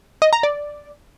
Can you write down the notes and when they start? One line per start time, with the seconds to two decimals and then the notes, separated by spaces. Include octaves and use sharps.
0.22 D#5
0.33 A#5
0.43 D5